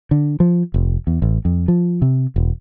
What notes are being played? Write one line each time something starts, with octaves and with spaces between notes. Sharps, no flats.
D3
F3
F1
E2
A1
F2
F3
C3
E1